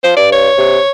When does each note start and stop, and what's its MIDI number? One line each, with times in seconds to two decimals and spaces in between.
0.04 0.15 53
0.04 0.16 72
0.17 0.49 43
0.17 0.29 74
0.32 0.91 73
0.58 0.79 48